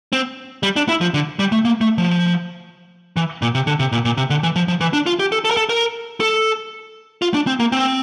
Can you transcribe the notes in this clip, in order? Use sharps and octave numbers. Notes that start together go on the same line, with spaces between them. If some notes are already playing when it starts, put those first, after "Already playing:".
C4
G3
D4
E4
F3
D3
G3
A3
A#3
A3
F3
E3
A#2
C3
D3
C3
A#2
A#2
C3
D3
E3
F3
F3
E3
D4
F4
G4
A4
A4
A#4
A4
A#4
A4
F4
D4
C4
A#3
C4